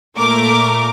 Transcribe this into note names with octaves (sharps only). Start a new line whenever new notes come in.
A#2 A3 A#4 D6